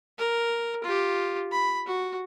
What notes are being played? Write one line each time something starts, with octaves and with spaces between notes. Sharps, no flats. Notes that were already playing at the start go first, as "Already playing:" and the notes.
A#4
F4 G4
B5
F#4